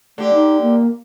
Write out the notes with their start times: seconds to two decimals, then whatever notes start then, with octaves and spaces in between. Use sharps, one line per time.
0.18 D3 A3 G4
0.34 D#4
0.62 A#3